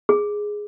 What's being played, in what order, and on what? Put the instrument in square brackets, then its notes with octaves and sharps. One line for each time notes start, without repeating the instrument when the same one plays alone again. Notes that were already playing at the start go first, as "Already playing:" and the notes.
[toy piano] G#4